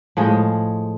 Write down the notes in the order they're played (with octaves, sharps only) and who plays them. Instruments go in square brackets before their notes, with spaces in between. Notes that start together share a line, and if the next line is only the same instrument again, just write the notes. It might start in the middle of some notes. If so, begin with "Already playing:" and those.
[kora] A2 F3 G#3 G#4